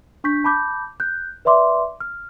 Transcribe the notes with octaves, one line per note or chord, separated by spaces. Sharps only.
D4 C#6 G6 B6
A5 B5 D6 G6
F#6 G6
B4 D5 E5 C6 D6
F6